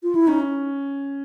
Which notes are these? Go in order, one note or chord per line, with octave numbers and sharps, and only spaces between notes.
F4
E4
C#4 D#4